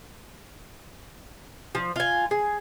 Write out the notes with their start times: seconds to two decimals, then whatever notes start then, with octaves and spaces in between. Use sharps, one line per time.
1.75 F3
1.96 F4 G#5
2.31 G#4